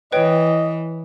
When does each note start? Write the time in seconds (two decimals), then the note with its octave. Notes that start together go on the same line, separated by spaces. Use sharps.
0.12 E3 B4 C#5 D#5 G5